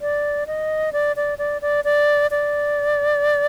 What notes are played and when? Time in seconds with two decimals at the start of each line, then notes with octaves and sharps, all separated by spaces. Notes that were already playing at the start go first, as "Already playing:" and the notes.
0.01 D5
0.47 D#5
0.93 D5
1.16 D5
1.38 D5
1.62 D5
1.85 D5
2.31 D5